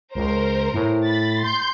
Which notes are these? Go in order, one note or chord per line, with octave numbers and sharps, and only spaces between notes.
C#2 A#4 C5
A2
B5 A6
C6 G6